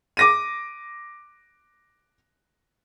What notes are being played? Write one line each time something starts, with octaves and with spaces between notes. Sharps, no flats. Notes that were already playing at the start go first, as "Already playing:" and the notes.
D6 A#6 D#7